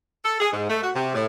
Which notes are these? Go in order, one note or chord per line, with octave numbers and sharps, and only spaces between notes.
A4
G#4
G#2
A3
F#4
C3
A2